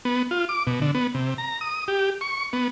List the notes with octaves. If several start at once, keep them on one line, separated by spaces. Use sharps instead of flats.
B3
F4
D6
B2
D3
B3
C3
A#5
D#6
G4
C#6
B3